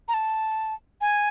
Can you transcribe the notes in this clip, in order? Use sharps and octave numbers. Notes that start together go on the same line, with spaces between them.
A#5
A5
G#5